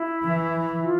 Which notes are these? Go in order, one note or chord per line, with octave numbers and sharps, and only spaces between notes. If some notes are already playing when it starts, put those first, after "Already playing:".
Already playing: E4
E3
F4